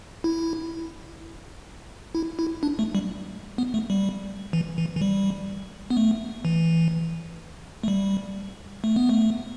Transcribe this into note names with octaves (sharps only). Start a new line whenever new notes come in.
E4
E4
E4
D4
A3
G3
B3
A3
G3
E3
E3
E3
G3
B3
A3
E3
A3
G3
A3
B3
A3